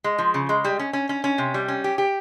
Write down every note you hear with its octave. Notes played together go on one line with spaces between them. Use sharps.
G#3
F3
C#3
G#3
G3
C#4
C#4
C#4
C#4
C3
G3
C#4
G4
G4